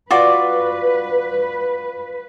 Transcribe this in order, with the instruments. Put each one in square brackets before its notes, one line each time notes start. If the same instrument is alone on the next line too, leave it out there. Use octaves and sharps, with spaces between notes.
[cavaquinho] F4 F#4 D5 [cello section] B4